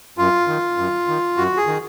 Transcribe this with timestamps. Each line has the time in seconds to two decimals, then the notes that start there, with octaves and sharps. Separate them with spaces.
0.18 F#2 F4
0.48 D#3
0.78 F#2
1.08 D#3
1.37 F#2 F#4
1.57 G#4
1.67 D#3